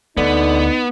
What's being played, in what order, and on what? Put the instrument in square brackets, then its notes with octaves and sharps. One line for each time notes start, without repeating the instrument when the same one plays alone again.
[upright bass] D2 [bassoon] D3 [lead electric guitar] B3 [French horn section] D#4